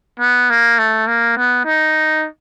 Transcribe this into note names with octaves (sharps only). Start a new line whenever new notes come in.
B3
A#3
A3
A#3
B3
D#4